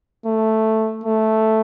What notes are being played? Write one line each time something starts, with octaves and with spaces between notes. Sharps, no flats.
A3
A3